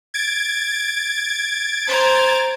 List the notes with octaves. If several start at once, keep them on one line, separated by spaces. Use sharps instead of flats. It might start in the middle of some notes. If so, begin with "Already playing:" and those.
G#6 A6 D7
C5 A#5